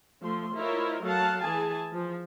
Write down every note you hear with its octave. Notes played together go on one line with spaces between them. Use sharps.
F3 A3 C6
E4 F4 A#4 C5 C#5 D#5
F#3 A3 F5 F#5 A5
E3 G#4 G#5 A5
F3